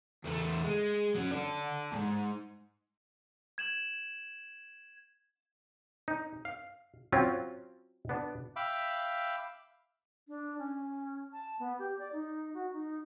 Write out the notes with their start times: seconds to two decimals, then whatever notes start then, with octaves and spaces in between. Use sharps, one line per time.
0.24 E2 A3
0.64 G#3
1.15 F#3 C#4
1.31 A4 D5
1.92 D#2 G#2
3.58 G#6 E7 F#7
6.08 D#4
6.45 F5
7.12 F#3 C4 C#4 F4
8.09 B3 D4
8.56 E5 F5 G5 B5 D6
10.28 D4
10.59 C#4
11.33 A5
11.59 B3
11.79 G4
11.99 D5
12.13 D#4
12.54 F#4
12.73 D#4